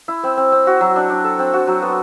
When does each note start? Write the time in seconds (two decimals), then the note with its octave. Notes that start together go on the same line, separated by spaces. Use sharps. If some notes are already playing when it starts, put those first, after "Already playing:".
0.08 E4
0.23 C4
0.37 C4
0.52 C4
0.67 F#4
0.81 F#3
0.96 D4
1.10 D4
1.24 A4
1.39 C4
1.53 F#4
1.67 F#3
1.82 B3